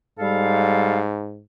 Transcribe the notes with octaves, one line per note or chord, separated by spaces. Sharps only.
G#2 G3 A4 F5